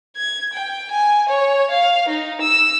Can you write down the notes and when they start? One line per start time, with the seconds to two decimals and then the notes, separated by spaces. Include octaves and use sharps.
0.16 G#6
0.53 G5
0.91 G#5
1.29 C#5
1.71 F5
2.08 D#4
2.41 E6